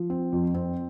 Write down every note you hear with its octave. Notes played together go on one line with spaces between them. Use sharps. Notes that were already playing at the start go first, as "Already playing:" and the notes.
Already playing: F3
C4
F2
C4